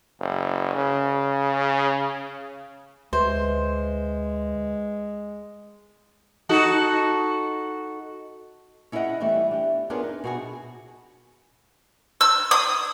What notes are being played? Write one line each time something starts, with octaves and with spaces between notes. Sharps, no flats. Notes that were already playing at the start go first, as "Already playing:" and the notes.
F#1
C#3
D2 G#3 B4 C5 E5
D#4 F#4 A4
C#4 E4 G#4 D5 D#5 F#5
E3 G3 A3 B3 E4
D4 G4
B3 C#4 D4 F4 G#4 A#4
D#4
B2 F#4 G#4
E6
D#6